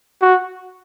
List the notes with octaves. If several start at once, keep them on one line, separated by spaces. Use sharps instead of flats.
F#4